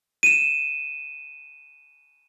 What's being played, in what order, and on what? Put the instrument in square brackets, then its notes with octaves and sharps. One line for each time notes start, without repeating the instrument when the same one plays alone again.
[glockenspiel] D#7 E7